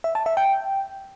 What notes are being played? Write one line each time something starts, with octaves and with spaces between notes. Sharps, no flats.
E5
A5
E5
G5